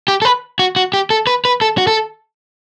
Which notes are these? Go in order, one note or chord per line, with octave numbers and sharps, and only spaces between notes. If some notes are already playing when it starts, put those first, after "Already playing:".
G4
A4
B4
F#4
F#4
G4
A4
B4
B4
A4
F#4
A4